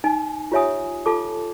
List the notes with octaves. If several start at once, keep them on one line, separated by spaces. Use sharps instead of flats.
D#4 G#5
F4 G4 C#5 E5 G#5 D#6
F4 A4 A5 D6